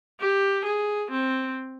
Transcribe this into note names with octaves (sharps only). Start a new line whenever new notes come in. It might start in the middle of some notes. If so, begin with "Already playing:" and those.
G4
G#4
C4